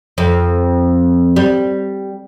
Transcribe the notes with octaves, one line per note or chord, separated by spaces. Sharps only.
F2
G3